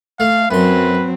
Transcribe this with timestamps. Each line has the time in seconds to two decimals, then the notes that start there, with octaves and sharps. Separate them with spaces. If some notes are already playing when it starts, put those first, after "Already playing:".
0.20 A3 F5
0.51 F#2 F#3 C4 B4 C6